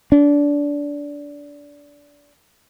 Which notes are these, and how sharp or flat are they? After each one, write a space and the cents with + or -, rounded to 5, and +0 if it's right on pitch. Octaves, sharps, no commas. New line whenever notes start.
D4 -20